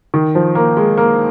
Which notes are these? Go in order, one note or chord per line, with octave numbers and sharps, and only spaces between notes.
D#3
F3
A#3
G#3
A#3